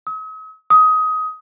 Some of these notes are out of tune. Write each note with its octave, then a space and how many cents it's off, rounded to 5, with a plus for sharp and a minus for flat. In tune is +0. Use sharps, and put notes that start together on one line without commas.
D#6 +45
D#6 +20